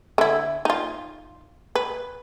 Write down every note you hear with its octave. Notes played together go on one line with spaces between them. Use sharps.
D3 E4
D#4 F4
B4